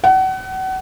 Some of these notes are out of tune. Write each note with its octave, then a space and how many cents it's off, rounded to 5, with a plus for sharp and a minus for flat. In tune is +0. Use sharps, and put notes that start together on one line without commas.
F#5 +35